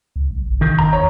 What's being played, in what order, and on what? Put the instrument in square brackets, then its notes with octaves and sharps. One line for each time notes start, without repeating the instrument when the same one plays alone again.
[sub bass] C#2
B1
G1
[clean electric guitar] D#3
[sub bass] E2 [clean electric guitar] A#5
[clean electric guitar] C#5